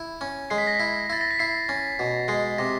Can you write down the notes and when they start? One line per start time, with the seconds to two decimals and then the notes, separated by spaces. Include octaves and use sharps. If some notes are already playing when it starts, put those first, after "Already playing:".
Already playing: E4
0.21 C#4
0.50 G#3 C7
0.58 B6
0.67 A#6
0.75 B6
0.80 E4
1.10 E4 A6
1.21 A#6
1.31 B6
1.39 E4 C7
1.69 C#4
1.99 B2
2.28 G#3 C7
2.58 C3 A#6